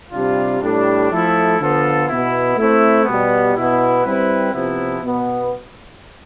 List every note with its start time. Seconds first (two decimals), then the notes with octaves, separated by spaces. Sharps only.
0.11 C3 G3 D4 F4
0.61 A2 G3 D4
1.10 F3 A3 E4 A4
1.59 D3 F3 B3 F4 A4
2.08 B2 B3 E4
2.57 A3 C4 E4
3.05 B2 G3 B3
3.55 B2 B3 E4
4.04 G3 C4 E4 B4
4.52 C3 F3 B3 E4
5.02 B2 B3